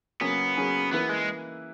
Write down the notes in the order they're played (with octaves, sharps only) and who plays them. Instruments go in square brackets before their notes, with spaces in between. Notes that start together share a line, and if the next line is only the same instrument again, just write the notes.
[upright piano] C#3 F#3 A#3 C#4 G#4 [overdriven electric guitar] B3
[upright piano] C#3 F#3 A#3 C#4 G#4
[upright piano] E3 A#3 E4 B4 [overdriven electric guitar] B3
[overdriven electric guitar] G#3